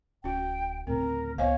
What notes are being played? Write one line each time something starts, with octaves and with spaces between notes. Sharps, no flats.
D1 C#4 F#4 G5
D2 A2 C#3 C4 A#4
C#2 B3 C5 C#5 D#5 F5 G#5